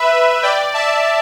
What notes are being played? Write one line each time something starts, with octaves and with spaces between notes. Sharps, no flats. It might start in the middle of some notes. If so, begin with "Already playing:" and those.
Already playing: B4 E5
D5 G5
E5 A5